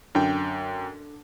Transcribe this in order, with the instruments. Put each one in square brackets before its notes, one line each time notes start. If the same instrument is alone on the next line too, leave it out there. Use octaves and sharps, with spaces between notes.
[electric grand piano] F#2 G5 [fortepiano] D3